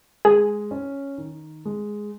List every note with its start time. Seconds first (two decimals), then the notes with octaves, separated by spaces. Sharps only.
0.25 G#3 G#4
0.71 C#4
1.18 D#3
1.65 G#3